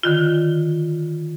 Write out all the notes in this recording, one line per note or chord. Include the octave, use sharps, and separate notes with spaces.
D3 D#3 F4